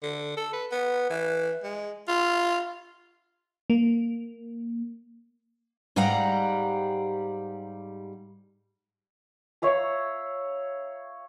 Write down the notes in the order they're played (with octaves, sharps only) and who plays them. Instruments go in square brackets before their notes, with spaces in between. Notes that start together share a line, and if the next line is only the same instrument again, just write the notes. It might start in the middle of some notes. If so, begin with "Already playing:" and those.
[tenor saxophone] D3
A4
B4
B3
E3
G#3
F4
[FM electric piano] A#3
[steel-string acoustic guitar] G#2 G3 G4 F5 F#5 A#5
[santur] C#5 E5 F5 A#5